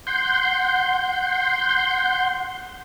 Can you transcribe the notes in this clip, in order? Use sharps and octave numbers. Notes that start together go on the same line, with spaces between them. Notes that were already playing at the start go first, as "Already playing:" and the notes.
F#5 C6 G6